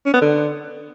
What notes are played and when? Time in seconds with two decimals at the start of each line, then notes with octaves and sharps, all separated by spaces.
0.06 C#4
0.14 B3
0.21 D3